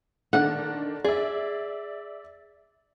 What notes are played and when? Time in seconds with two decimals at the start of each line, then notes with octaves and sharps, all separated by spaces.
0.33 D3 D#3 D4 F#5
1.04 G#4 D5 E5